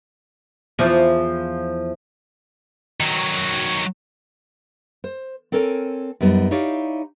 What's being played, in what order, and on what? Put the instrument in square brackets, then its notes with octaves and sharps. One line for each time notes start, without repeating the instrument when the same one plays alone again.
[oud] E2 F3
[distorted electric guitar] D#3 F#3
[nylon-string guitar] C5
C4 A4 A#4 C#5 G#5
F#2 G3 B3 D#4
D#4 E4 G4 C#5 D5 F5